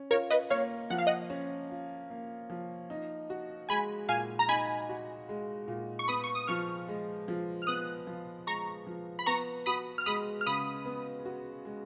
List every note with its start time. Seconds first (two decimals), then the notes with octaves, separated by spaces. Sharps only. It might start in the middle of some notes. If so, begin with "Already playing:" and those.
Already playing: C#4
0.11 F4 A#4 C#5
0.30 B4 D#5
0.50 A#3 C#5 F5
0.90 F3 F#5
0.98 F5
1.07 D#5 F#5
1.30 C#4
1.70 F4
2.10 A#3
2.50 F3
2.90 D#4
3.30 F#4
3.69 G#3 G#5 B5
4.08 A#2 F5 G#5
4.39 A#5
4.48 D#4 G#5 B5
4.89 F#4
5.29 G#3
5.68 A#2
5.99 C#6
6.08 B3 B5 D#6
6.24 C#6
6.35 D#6
6.47 F3 C#6 F6
6.88 G#3
7.28 F3
7.62 F6
7.67 B3 D#6 F#6
8.07 F3
8.46 G#3 A#5 C#6
8.87 F3
9.19 B5
9.26 B3 A#5 C#6
9.66 F#4 B5 D#6
9.98 F6
10.06 G#3 B5 D#6
10.41 F6
10.46 C#3 B5 D#6
10.85 B3
11.25 F#4
11.65 G#3